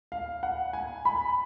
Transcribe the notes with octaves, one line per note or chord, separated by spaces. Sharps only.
F5
F#5
G#5
B5